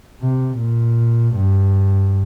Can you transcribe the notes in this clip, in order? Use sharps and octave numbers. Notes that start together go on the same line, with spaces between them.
C3
A#2
G2